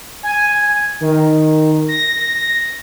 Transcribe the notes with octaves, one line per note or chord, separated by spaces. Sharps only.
G#5
D#3
A#6